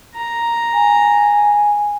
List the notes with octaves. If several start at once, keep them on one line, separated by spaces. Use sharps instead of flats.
A#5
G#5